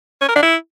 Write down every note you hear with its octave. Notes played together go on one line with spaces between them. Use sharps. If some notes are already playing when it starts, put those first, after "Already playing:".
C#4
A#4
D4
E4